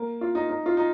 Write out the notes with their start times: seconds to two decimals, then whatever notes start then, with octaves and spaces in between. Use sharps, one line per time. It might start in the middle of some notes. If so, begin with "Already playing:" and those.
Already playing: A#3
0.21 F4
0.35 D#4
0.49 D#4
0.66 F4
0.77 D#4